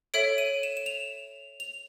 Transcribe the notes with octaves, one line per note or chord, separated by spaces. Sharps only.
A4 C#5 E5 D7
D#7
E7
E7
F7
F7